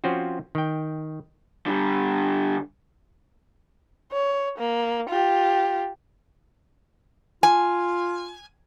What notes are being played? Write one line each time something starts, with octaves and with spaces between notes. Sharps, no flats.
F3 C4 C#4 F4 F#4
D#3 G5
D3 G3
C#5
A#3
F4 G4
F4 G#5